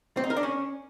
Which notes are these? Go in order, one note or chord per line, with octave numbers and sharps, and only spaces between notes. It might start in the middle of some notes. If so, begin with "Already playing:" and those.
C4
D#4
A#4
D4
C#4